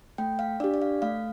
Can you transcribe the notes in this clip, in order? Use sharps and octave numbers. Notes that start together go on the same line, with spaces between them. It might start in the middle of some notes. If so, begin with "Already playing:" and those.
A3 G5
F5
D4 G4 D5
D5
F5
A3 F5